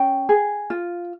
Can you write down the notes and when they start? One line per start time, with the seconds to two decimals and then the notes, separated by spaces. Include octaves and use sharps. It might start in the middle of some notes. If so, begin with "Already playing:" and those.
Already playing: C#4 G5
0.29 G#4
0.70 F4